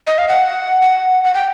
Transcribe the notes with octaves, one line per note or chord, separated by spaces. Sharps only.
D#5
F5
F#5
F#5
F#5
G5